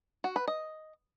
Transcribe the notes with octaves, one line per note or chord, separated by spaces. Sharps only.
F#4
B4
D#5